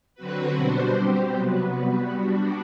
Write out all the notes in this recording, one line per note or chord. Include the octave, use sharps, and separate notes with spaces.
D3 F#3 C4 F#4 B4
B2 G3 D4 F#4 C5
G3 C4 G4 C5
C3 F#3 B3 F#4 B4
G3 B3 F#4 B4
G3 B3 D4 F#4